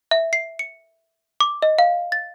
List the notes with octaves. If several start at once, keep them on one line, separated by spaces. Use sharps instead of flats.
E5
C7
C#7
D6
D#5
F5
A6